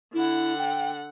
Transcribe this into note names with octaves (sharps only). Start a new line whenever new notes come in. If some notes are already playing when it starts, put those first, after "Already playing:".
D3 E4 F#5
G5